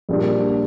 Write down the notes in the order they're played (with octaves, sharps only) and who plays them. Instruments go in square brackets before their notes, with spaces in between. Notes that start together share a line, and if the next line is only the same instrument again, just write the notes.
[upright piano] A#1 A#2 G3 A#3 D4